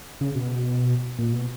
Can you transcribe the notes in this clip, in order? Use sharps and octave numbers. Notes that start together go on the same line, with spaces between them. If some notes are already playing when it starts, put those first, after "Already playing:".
C#3
B2
A#2
B2